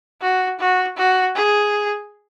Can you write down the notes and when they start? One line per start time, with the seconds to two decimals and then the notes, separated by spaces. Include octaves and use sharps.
0.21 F#4
0.59 F#4
0.97 F#4
1.35 G#4